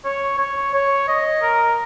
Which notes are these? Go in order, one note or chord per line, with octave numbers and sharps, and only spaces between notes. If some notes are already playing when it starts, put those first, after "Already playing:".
C#5
C#5
C#5
D#5
A#4